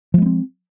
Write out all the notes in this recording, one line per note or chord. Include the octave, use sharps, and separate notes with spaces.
F3 G#3 B3 C4